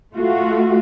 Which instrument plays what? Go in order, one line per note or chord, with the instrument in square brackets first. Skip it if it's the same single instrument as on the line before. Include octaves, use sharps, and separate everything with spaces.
[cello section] A3 F4 F#4